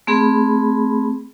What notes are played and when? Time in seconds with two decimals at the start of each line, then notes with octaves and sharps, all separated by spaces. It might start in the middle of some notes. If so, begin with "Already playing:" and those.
0.07 A3 C4 G#4 B5